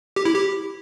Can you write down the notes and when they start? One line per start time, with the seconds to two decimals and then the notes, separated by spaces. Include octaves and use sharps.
0.16 G4
0.25 E4
0.34 G4